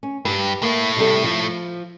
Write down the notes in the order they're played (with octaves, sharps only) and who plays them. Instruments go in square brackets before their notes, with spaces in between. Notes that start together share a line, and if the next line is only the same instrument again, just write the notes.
[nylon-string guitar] C#4
[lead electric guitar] G2 [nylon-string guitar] G4 B4
[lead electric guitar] A2 A3 [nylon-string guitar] A#3
[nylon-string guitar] C3 G3 A4
F3